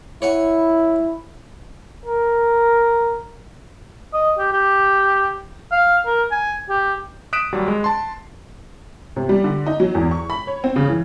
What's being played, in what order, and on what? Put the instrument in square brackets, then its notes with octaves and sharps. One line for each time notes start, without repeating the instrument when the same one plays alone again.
[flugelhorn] E4 [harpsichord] C#5 F#5 G#5
[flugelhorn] A#4
[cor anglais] D#5
G4
G4
F5
A#4
G#5
G4
[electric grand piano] D#6 F#6 B6 D7 E7
D#2 F#3 G3
G#3
A5 C6
[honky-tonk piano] C3
G3
D3
D#4
F#3
E2
C#6
B5
C#5
C4
C#3
E3